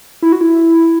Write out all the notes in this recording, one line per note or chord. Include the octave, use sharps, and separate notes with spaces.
E4
F#4
E4